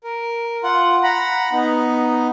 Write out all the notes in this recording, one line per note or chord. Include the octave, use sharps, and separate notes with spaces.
A#4
F4 F#5
F#5 A#5 B5
B3 D#4